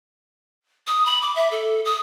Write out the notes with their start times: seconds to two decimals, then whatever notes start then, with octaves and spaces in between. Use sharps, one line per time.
0.87 D#6
1.06 B5
1.22 D6
1.36 E5
1.51 A4
1.85 D#6